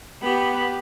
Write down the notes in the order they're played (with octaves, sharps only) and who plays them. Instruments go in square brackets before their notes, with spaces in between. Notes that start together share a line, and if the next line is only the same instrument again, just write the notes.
[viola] B3 B5 [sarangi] G4